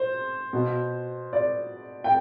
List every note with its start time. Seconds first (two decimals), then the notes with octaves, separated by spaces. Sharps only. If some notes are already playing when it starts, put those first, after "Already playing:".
Already playing: C5
0.53 B2
1.33 D5
2.04 G5